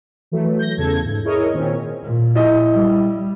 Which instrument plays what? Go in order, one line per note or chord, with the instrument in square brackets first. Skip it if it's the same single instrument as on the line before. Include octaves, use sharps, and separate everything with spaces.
[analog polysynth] E3 F#3 A3
G6 A#6
E2 C#3 A4 G#6
G#2
E4 G#4 A#4 C#5 D#5
A#2 D#3 C4 C#4
[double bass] A#2
[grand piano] E4 D#5
[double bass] G3